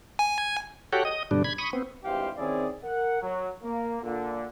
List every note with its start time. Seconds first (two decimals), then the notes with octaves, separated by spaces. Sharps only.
0.19 G#5
0.93 F#4 G4 A4 C#5 F#5 G5
1.05 D#5 D#6
1.31 G2 B2 D3 G3 D4
1.44 B5 G#6
1.58 B5 C#6 D#6
1.73 B3 C4
2.04 G#1 G2 E3 G4 C5 F5
2.37 D#3 C4 C#4 E4 G#4 D5
2.84 A#4 F#5
3.22 F#3
3.63 A#3
4.03 A#2 D3